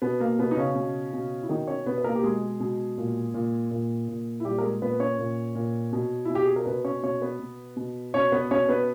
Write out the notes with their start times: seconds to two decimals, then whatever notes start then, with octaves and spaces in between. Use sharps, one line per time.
0.02 B2 B3
0.20 A#3
0.39 B2 B3
0.51 D#4
0.57 C#3 C#4
0.76 B2
1.13 B2
1.43 E4
1.49 B2 D#3 D#4
1.67 C#4 C#5
1.86 B2 B3 B4
1.98 B4
2.04 A#3 A#4
2.15 G4
2.23 B2 G#3 G#4
2.60 B2
2.98 A#2
3.34 A#2
3.71 A#2
4.08 A#2
4.40 E4
4.44 A#2 G3 G4
4.58 A#4
4.63 G#3 G#4
4.82 A#2 B3 B4
5.00 C#4 C#5
5.19 A#2
5.55 A#2
5.93 B2
6.25 B2 E4
6.35 G4
6.45 G#4
6.56 A#4
6.66 B2 B3 B4
6.84 C#4 C#5
7.03 B2 C#4 C#5
7.22 B3 B4
7.39 B2
7.77 B2
8.14 B2 C#4 C#5
8.32 B3 B4
8.51 B2 C#4 C#5
8.69 B3 B4